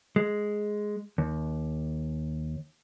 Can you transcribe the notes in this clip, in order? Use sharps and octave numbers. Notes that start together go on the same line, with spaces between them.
G#3
D#2